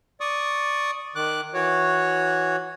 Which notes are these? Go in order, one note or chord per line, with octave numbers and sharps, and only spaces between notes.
D5 C#6 D#6
D#3 D6 F#6
E3 F#4 C#5